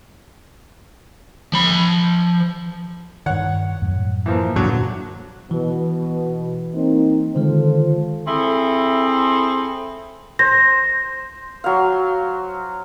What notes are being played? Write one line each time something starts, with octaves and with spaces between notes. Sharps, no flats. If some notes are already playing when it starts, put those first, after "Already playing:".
F3 B5
G2 D#3 C#5 F#5
F#2 A2
E3 F3 A#3
G2 A#2 D3 F#3 D4
B2 E3
A#3 C4 D#4
D3 D#3 G#3 F4 A4 C5
C4 E4 G#4 A4
C5 A#6
F#3 F5